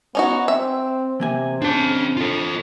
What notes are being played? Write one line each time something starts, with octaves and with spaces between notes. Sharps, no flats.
B3 C#4 D#4 F#4
C4 E5
C3 E3 A#3 G#5
C#3 C4 D4 C5 A5
F4 A4